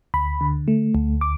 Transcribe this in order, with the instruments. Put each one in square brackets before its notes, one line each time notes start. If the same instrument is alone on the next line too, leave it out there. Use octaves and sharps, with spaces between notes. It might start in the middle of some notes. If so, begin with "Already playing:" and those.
[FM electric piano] D2 B5
D3
A3
D2
D6